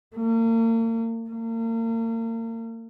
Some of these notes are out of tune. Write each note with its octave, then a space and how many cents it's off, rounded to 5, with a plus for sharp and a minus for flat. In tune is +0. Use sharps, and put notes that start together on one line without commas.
A#3 -40
A#3 -40